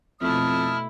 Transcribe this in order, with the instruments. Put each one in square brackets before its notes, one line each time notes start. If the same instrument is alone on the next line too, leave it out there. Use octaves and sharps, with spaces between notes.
[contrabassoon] F2 [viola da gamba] B2 A3 [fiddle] E4 [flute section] A5 D#6 F6